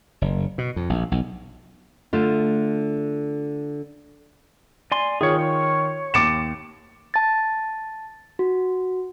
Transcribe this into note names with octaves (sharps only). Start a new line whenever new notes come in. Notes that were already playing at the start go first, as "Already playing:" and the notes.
F#1
B2
F2
A#1
B1
D3 A3 F4
D5 G#5 C6
D#3 F4 G#4 C#5
C#5
D#2 D6 A6 C#7 D7 E7
A5 A6
F#4